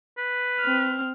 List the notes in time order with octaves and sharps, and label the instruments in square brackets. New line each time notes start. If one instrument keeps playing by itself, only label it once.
[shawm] B4
[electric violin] C4 F6